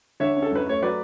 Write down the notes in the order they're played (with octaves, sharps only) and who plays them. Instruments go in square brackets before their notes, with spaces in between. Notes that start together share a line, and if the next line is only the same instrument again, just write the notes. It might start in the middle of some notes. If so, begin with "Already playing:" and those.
[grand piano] D3 C#5 E5
C#4
A4
F#2 B4
A3 C#5
F#3 B4 D5